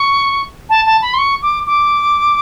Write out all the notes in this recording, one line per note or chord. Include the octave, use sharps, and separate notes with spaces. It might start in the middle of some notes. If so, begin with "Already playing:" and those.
Already playing: C#6
A5
A5
B5
C6
C#6
D6
D6